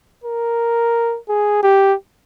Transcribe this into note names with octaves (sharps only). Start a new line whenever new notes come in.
A#4
G#4
G4